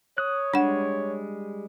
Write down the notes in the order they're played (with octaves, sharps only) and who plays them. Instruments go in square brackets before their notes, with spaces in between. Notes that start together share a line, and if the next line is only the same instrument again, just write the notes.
[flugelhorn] C#5 [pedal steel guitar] D#6 F#6
[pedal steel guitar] G3 G#3 [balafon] D4 F#5